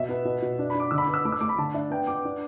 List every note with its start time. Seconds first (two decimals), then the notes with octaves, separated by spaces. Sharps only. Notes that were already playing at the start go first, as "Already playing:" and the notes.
Already playing: B2 E5
0.09 B3
0.25 B2
0.42 B2
0.59 D4
0.70 D4 B5
0.80 D6
0.91 D3 E6
0.98 B5
1.02 D6
1.07 B3
1.14 E6
1.25 A3 D6
1.32 E6
1.41 A3 D6
1.49 B5
1.58 D3 A5
1.74 D4 E5
1.90 B3 G5
2.07 B3 D6
2.25 D4